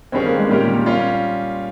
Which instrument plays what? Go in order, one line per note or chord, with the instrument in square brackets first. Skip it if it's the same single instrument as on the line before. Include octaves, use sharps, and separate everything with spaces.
[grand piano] G2 D#3 G3 C#4 G#4 [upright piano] C4
[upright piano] A#3
G#3
[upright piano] A#2 [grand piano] D#3 G3 C#4 G4 A#4
[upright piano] A#2
A#2
[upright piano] A#2 [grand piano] G3 C#4 F4